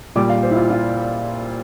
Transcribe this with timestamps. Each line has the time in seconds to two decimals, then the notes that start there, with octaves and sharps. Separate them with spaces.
0.15 A#2 G3 D6
0.29 F5
0.43 C5
0.51 E4
0.56 F4
0.70 F4